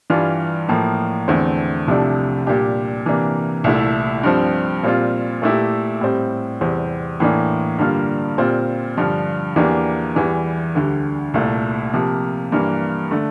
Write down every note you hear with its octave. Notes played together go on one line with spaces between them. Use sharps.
G2 E3 G3 D4 F4
A2 F3 A#3
E2 D3 A3 C4
C2 C3 F3 A3 D4
A#2 G3 D4 G4
C3 E3 A#3 D4
C2 A#2 A3 E4
G2 F3 C4
A#2 G3 C4 F4
A#2 A3 E4 G4
A2 G3 C4
E2 C3 G3 C4
A2 E3 A#3 D4
G2 D3 G3 A#3 F4
A#2 G3 C4 F4
G2 D3 F3
E2 E3 A#3 D4 G4
E2 E3 G3
D2 D3 G3
C2 A#2 A3
C3 F3 A#3
G2 E3 A#3
D3 A3